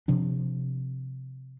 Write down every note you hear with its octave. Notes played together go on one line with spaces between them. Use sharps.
C3 F3 D4